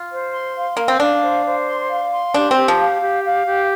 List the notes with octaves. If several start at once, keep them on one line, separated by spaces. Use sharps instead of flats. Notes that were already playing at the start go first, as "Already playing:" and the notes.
Already playing: F4
C5
C6
F5
A#3 F5
C4
D4 F5
C5
C5
C6
F5
C6
D4 G4
C4
G4
F3
F5
G4
F5
G4